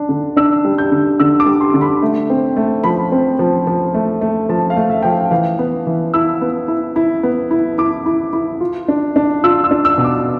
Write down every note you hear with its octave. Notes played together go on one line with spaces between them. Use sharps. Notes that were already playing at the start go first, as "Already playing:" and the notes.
Already playing: D4
D3
D4 E6
G3
G6
D3
D3 E6
D6
G3
C6
D3
B5
A3
C4
A3
F3 B5
C4
F3
F3
A3
A3
F3 A5
F5
A3
E5
F3 G5
F5
E3 F5
B3
E3
E4 E6
B3
E4
E4
B3
E4
E4 D6
E4
E4
F4
D4
D4
F4 E6
E6
D4
E6
B2
D6